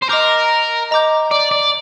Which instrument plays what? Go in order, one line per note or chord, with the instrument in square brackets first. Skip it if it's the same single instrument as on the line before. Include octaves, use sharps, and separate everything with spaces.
[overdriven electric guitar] C5
[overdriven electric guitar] A#4 [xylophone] D#5 A#5 D6 G6
[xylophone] D#5 A#5 D6 G6
[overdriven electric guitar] D5
D5